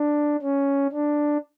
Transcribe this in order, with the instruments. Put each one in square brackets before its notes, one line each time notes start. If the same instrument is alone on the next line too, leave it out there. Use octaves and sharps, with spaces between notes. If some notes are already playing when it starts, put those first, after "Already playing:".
Already playing: [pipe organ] D4
C#4
D4